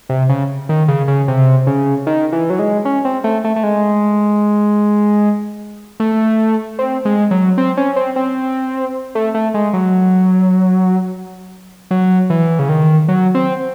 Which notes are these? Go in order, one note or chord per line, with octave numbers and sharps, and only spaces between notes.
C3
C#3
D#3
C#3
C#3
C3
C#3
D#3
E3
F#3
G#3
C#4
C4
A3
A3
A3
G#3
A3
C4
G#3
F#3
C4
C#4
C4
C4
A3
A3
G#3
F#3
F#3
E3
C#3
D#3
F#3
C4